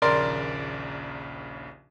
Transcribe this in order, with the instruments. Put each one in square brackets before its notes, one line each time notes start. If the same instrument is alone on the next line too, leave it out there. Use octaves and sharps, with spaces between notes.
[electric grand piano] A#1 D#2 C#3 [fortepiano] A#4 D5 C6